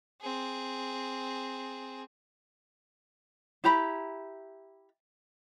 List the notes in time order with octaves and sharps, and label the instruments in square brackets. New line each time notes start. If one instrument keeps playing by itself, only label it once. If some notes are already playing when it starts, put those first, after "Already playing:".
[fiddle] C4 G#4
[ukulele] E4 G4 A#5 B5